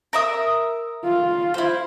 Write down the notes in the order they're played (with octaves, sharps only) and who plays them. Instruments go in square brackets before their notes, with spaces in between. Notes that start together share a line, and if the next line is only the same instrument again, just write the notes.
[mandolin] A#4 E5 D#6
[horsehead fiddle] F4
[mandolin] E4 C5